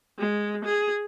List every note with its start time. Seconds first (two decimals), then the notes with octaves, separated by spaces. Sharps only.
0.19 G#3
0.65 G#4